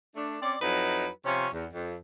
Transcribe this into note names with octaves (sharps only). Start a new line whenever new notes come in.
A3 D4
C4 C#4 D5
F2 F#3 D#4 E4 B4
C3 F3 C#4
E2
F2